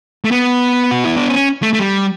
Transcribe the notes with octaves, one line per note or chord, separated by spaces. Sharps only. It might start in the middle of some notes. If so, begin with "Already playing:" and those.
A3
B3
F#4
E4
D4
C#4
A3
A3
G3